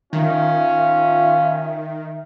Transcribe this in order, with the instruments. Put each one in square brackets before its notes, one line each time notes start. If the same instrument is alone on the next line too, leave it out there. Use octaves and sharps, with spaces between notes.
[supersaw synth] D#3 [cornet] C#4 [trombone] F4 [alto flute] E5